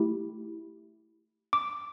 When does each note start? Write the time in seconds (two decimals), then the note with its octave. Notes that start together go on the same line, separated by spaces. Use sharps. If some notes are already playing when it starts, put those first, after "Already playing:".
Already playing: A3 E4 G4
1.53 D6